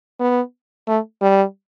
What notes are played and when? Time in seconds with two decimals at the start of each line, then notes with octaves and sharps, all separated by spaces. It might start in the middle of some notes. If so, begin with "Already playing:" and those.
0.20 B3
0.88 A3
1.22 G3